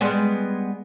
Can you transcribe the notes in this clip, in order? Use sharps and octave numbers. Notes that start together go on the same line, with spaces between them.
G3 G#3 B3